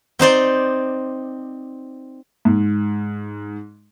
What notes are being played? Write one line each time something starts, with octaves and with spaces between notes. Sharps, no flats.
C4 D#4 C5 D5
G#2